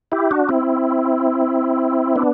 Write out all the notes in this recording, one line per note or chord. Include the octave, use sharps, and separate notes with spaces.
E4 G4
D4 F#4
C4 E4
B3 D4